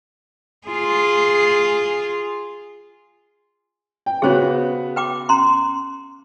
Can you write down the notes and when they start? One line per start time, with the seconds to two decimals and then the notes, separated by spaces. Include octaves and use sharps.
0.68 F4 G#4
4.06 G5
4.22 C#3 B3 F#4 G#4 C5 C#5
4.96 B4 G5 D6
5.29 C#4 A#5 C6